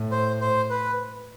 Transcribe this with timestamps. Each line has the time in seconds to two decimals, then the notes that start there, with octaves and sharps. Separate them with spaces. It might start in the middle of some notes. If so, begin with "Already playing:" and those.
Already playing: A2
0.11 C5
0.41 C5
0.70 B4